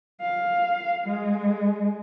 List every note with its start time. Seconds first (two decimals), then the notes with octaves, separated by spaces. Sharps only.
0.21 F5
1.07 G#3